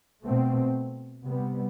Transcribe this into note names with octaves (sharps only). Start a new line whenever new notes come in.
B2 A3 C4
C3 G3 B3